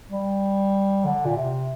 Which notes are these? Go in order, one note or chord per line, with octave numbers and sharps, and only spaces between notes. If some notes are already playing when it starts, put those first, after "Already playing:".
G3
D3
A#2
C3